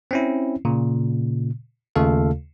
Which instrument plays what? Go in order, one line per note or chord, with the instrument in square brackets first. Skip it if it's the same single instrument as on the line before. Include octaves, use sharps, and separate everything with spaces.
[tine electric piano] C4 C#4 E4
A#2 C#3
D#2 C#3 A3 F4 A4 F5